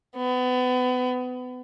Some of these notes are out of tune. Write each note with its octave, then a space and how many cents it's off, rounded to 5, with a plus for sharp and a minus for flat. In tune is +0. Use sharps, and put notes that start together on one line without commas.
B3 +30